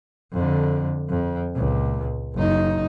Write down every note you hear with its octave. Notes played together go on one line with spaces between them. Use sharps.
F2 D3
F2
C#2 A#2
F#1 D#4